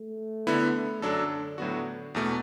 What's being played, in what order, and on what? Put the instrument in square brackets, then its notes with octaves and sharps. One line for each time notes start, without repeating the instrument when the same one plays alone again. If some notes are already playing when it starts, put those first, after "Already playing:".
Already playing: [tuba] A3
[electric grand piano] D3 B3 E4
[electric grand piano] F#2 F#3 D4 A4 [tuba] D3
[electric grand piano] A2 F#3 B3 F#4 [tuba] D3
[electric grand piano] E2 B2 A3